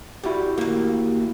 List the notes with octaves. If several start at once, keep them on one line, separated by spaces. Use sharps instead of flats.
G3 E4 F#4 G4
D#2 A#3